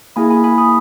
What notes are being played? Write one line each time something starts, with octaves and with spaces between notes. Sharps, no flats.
A#3 E4 G#4 G#5 B5
G#5 B5
G#5 B5
B5 D#6